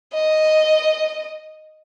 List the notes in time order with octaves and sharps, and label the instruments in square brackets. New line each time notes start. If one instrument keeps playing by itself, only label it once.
[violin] D#5